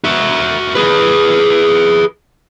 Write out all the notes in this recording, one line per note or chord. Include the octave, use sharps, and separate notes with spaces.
F#4 E5
G#4 B4